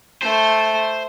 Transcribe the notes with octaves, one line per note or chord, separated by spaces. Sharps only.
A3 C5